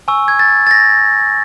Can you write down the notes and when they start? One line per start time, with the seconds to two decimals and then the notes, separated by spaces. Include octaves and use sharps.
0.08 G#5 C#6 E6
0.28 G#6
0.39 A6
0.67 A6
0.71 A#6